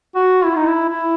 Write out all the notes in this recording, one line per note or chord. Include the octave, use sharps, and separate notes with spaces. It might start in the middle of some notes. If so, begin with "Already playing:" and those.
F#4
E4
D#4
E4
E4